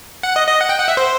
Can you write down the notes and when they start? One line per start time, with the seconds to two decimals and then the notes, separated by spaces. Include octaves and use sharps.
0.23 F#5
0.36 D#5
0.47 D#5
0.61 F#5
0.69 G5
0.80 F#5
0.88 E5
0.97 C5